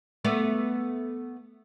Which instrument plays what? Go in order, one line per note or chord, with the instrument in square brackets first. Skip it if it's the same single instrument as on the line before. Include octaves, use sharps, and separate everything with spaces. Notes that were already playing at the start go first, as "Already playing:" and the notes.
[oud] A3 B3 D5